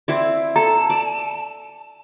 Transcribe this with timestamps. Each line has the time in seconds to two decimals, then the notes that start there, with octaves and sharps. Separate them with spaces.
0.08 C4 E4 D5
0.56 A4 A5 A#5
0.90 D5